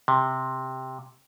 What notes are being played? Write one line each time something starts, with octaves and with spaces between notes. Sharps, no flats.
C3